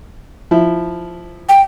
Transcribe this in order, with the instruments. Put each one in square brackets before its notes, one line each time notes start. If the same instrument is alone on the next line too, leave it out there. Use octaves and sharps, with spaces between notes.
[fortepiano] F3 E4
[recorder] G5